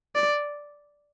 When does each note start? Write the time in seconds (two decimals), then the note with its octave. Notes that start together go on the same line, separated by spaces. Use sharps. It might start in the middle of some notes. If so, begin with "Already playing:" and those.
0.15 D5